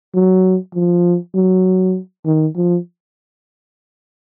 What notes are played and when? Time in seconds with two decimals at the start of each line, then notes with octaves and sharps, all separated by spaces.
0.14 F#3
0.75 F3
1.35 F#3
2.26 D#3
2.56 F3